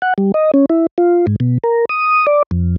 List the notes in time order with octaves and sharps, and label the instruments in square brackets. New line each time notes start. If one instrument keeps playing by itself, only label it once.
[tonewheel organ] F#5
G3
D#5
C#4
E4
F4
G#2
B2
A#4
D#6
D5
F2